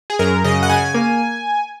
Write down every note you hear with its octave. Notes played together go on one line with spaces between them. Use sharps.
G#4
F#2 A#4
C#3 D#5
F#5
C#3 G#5
A#3